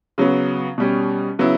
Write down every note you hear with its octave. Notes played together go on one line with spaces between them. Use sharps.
C#3 F#3 B3
B2 G3 C#4
C#3 F#3 B3 E4